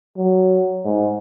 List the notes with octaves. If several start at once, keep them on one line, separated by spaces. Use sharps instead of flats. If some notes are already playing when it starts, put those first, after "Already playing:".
F#3
G#2